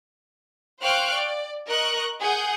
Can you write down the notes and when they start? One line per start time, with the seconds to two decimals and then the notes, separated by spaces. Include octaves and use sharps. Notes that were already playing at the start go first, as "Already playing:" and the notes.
0.82 C5 F5 G5 C#6 F6 F#6
1.15 D5
1.67 A#4 D#5 C#6 F#6
2.19 G#4 F#5 G6